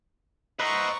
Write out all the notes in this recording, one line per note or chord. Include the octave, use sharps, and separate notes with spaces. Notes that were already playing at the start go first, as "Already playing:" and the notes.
B4 C5 D#5 E5 F#5 A#5 C#6